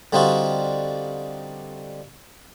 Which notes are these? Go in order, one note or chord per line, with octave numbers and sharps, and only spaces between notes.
D3 G3 C4 D#4 F4 F#4